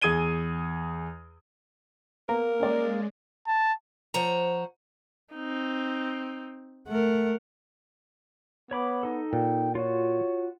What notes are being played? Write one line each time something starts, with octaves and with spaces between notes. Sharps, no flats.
E2 G#4 D#6 G#6 D#7 G7
A#3 B3 A#4
G#3 C#4 D5
A5
F3 C5 C#5 F#5 A#5
C4 D#4
A3 A#4 F#5
B3 C#5 B5 D6
D#4 A4
A#2 G5
F4 F#4 C#5